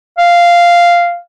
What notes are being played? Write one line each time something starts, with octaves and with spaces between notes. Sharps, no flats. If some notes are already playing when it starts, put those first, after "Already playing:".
F5